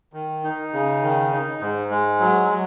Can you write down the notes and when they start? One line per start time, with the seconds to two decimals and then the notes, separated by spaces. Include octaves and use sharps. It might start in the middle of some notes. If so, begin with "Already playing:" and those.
0.13 D#3
0.44 D#4
0.73 C#3
1.02 D#3
1.32 D#4
1.61 G#2
1.91 G#3
2.20 F#3
2.49 F#3